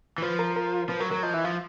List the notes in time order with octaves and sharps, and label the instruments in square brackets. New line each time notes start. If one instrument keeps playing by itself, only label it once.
[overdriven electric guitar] E3
[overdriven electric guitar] F3 [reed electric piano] B4
[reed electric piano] A#4
A#4
[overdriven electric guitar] F3 [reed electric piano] B4
[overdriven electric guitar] F#3 [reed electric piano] A#4
[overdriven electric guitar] F#3 [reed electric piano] A#4
[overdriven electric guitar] F3 [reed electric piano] D#5
[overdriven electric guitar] E3 [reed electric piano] E5
[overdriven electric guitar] F3 [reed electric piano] F5